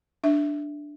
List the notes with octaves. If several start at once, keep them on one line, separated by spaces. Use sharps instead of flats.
D4 E5